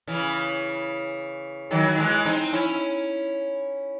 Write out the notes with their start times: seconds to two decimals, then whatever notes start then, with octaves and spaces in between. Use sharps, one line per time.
0.07 C#3 E3
1.71 D#3 F#3
1.98 E3 G#3
2.25 C4 D#4
2.53 C#4 E4